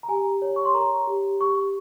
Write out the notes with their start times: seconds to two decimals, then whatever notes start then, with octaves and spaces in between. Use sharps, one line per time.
0.03 A#5
0.08 G4 G#5
0.42 C#5
0.56 C#6
0.65 C6
0.74 A#4 A#5
1.07 G4
1.40 G4 C#6